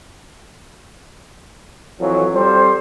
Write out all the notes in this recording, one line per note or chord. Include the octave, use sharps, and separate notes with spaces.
F2 E3 F#3
G3 C4 A4 C5